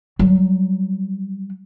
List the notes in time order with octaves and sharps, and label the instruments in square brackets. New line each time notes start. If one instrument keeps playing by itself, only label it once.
[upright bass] F#3 G3